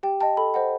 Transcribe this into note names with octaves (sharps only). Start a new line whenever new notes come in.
G4 G5
D#5 G5 A5
A4 B5
C5 D#5 F#5